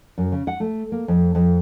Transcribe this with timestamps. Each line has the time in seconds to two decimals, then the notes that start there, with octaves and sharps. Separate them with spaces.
0.18 F#2
0.32 C#3
0.47 F#5
0.60 A3
0.92 A#3
1.08 F2
1.35 F2